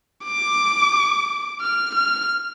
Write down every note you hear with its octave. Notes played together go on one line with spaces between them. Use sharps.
D6
F6
F6